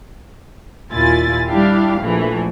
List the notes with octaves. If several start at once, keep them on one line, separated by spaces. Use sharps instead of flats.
D#2 A#2 E4 F4 G#5 A6
G3 D4 E4 G4 F5
A#1 E3 F3 A3